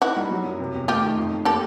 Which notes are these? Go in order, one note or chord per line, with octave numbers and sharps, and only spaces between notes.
D#4 E4 F#4
G3
F#3
F#2
C3
E2
A3 F4 G4
D#3
F2
F2
A#3 G4 A4